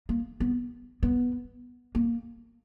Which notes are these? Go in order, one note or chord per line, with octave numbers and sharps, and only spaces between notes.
A#3
B3
B3
A#3